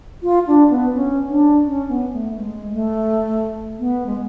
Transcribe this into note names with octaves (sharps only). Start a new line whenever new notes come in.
F4
D4
B3
C#4
D4
C#4
B3
A3
G#3
A3
B3
G#3